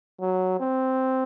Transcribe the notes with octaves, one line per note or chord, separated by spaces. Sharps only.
F#3
C4